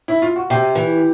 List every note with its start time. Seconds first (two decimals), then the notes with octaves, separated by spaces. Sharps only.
0.08 E4
0.22 F4
0.36 F#4
0.50 C3 G4
0.75 E3